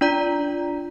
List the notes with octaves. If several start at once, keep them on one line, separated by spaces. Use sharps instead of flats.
D4 F4 D5 A#5